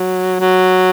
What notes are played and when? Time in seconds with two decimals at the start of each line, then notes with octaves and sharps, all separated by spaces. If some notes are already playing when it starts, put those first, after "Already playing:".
Already playing: F#3
0.40 F#3